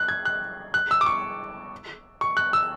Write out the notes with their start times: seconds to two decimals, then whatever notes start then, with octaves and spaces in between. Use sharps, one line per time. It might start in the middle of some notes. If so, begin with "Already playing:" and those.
Already playing: F#6
0.08 G#6
0.25 F#6
0.74 F#6
0.91 E6
1.01 D6
1.06 C#6
2.21 C#6
2.37 F#6
2.53 E6